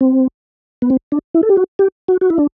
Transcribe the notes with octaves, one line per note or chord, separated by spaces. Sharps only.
C4
B3
C4
D4
E4
A4
G4
F#4
G4
F#4
F#4
E4
D4